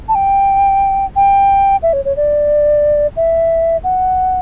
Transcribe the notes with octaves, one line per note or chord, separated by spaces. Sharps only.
A5
G5
G5
E5
C#5
C#5
D5
E5
F#5